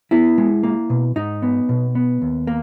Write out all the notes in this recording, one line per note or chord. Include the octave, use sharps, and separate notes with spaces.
B3 E4
G#3
A#3
B2
G#2 D#4
B3
B2
B3
D#2
A#3